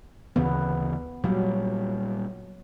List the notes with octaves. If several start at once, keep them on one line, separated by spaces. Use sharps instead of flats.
D2 C#3 E3 B3
A#2 F#3 G3